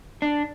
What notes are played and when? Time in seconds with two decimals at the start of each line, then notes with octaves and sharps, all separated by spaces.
0.22 D4